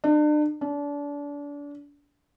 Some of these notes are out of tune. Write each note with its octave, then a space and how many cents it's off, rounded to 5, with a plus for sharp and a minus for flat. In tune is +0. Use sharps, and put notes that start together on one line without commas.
D4 +40
D4 -30